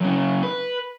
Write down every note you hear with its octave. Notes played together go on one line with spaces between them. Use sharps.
F#2 C#3
B4